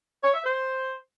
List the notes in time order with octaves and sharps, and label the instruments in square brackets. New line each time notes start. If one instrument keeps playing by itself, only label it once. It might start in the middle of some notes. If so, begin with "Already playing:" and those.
[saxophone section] C#5
E5
C5